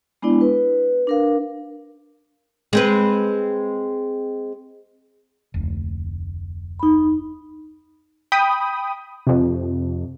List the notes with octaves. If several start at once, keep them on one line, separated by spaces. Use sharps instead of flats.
G#3 B3 D4 E4 D5
B4
D4 A#4 F5
G#3 C4 B4
F1 D2
D#4 B5
G5 B5 D#6
F2 C3